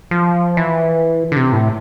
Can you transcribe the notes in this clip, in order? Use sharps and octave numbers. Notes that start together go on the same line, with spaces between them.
F3
E3
D3
C3
A2